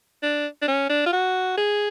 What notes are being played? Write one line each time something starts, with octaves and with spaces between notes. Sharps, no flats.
D4
D4
C#4
D4
F4
F#4
G#4